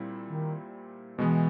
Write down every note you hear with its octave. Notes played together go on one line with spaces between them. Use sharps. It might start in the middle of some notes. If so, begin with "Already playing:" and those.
Already playing: A#2 G3 C4 E4
D#3
B2 E3 G#3 B3